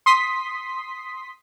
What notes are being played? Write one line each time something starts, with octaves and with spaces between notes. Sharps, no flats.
C6 D#6 B6